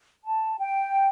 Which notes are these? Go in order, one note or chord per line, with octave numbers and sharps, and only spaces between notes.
A5
G5